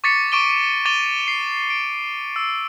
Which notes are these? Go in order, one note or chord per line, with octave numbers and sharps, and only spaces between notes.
C#6 D6 A6 B6 C#7
C#6 D6 D7 D#7 G7
C#6 D6 A6 D#7 F7 G7
C7
D7
E6